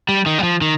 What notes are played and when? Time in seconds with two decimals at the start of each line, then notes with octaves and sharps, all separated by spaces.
0.09 G3
0.26 D#3
0.39 G3
0.43 F3
0.61 D#3